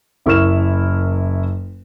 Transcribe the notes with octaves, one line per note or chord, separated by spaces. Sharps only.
F#1 E4 A#4 C#6 F6 E7